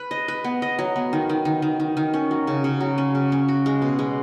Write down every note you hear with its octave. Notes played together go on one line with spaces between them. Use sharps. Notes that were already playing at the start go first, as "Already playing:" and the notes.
Already playing: B4
D#5
B4
B3
D#5
F#3
B3
D#3
D#3
D#3
D#3
D#3
D#3
C#4
F#3
C#3
C#3
F#3
C#4
C#3
C#4
F#4
G#3
B2
G#3